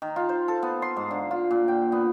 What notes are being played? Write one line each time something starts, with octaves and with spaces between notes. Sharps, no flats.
D#3
F4
C5
A4
B3
C6
G#2
D3
F4
A#2
G5
B3